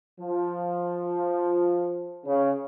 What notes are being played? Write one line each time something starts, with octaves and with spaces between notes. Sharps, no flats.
F3
C#3